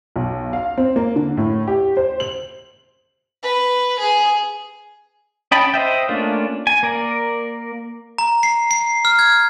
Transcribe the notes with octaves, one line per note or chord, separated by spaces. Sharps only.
B1
F5
C4
A#3
D3
A2
G4
C5
F#7
B4
G#4
C#4 D#5 G5 A5 B5
C5 D#5 E5 G5
A3 A#3 C#4 D4 F4
G#5
A#3 A#4 D5
A#5
C7
C7
F6
G#6